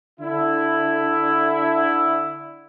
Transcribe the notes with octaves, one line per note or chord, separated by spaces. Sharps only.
D3 E4